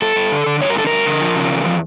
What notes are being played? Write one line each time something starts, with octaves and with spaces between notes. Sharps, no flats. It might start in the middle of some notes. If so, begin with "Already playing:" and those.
G2 A4
G2
D3
D3
G2 C#5
A#4
D3 A4
G2 A#4
D3
F3
C#3
E2
F3